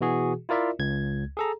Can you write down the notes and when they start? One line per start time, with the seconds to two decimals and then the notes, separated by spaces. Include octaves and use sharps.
0.01 B2 E3 F#4 G#4
0.49 E4 F4 A#4 D5 E5
0.79 C#2 G#6
1.37 G#4 A4 A#5